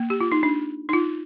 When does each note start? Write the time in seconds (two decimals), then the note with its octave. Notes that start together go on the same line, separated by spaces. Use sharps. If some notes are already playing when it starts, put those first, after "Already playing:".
Already playing: A#3
0.10 G4
0.20 F4
0.32 D#4
0.43 D4
0.89 D#4
0.93 F4